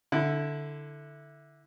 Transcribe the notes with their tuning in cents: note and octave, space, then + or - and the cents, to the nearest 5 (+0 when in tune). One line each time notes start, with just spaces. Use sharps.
D3 +0 E4 +0